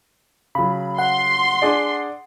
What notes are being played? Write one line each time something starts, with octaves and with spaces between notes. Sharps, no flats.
C#3 F#3 B5
F#5 C6
D4 G#4 D5